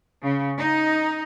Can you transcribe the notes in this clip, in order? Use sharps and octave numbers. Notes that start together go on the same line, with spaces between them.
C#3
D#4